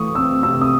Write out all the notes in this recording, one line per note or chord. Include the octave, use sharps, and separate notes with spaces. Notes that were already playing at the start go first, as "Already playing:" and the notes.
Already playing: E3 A3 C#6 D#6
C4 E6
C3 E6
D#6